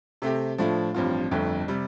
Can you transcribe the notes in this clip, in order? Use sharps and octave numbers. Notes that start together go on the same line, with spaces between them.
C3 A3 C4 G4
A2 F3 A3 D4 F4
A1 G2 F3 C4 F4
G1 F2 D3 A3
C3 G3